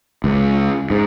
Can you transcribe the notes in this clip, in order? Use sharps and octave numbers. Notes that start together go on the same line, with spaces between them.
C#2
G#2